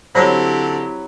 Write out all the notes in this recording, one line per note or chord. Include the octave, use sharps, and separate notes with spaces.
D3 F#3 C4 E4 G4 C5 C#5 B5